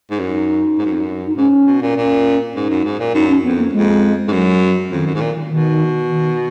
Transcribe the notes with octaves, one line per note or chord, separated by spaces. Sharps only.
G#2
F#2 D#4
G#2
F#2
F2
F#2
D#4
G#2 C#4
B2
A#2
A#2 C#4
G#2 D#4
F#2
G#2
A#2
F#2 D#4
C#4
F2 B3
A#3
F2 G#3
G#2
F#2 F#3
F2 D#3
F#2
G#2
A#2
B2 D#3
D#3